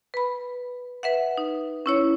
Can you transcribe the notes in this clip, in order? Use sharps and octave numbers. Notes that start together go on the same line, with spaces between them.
B4 B5
B4 E5 F#5
D#4
C#4 E4 C#5